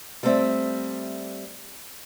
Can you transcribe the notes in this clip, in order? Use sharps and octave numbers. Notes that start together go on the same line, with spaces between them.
G3 A3 B3 C4 D5 E5